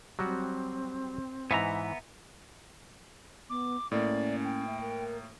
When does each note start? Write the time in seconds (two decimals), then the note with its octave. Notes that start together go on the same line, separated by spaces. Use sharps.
0.19 F#3 G3 C4 F#4
1.51 G#2 E3 B3 E5 A#5
3.50 B3 D6
3.92 A2 A#3 C#4 D5
4.45 G5
4.67 E5
4.81 A#4